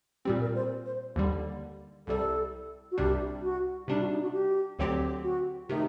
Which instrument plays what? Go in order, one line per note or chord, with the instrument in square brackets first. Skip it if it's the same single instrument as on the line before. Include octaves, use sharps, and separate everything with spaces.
[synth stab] A#2 G3 C4 [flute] G4
[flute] A#4
C5
C5
[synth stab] D#2 D3 G3
[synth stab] C2 C3 G3 [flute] A4
[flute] F#4
[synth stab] C2 C3 G3 D4 [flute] G4
[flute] F#4
[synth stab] C3 G3 D4 [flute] D#4
[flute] F#4
D#4
F#4
G4
[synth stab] D2 D3 F#3 C4 G4
[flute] F#4
[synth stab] C3 D#3 A3 [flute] D#4